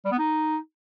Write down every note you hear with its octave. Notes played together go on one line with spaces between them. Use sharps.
G3
B3
D#4